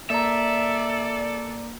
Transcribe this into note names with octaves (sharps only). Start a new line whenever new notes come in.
A#3 A4 D5 E5 A#5